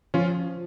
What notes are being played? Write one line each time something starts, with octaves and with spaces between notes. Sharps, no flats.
F3 C#4 F4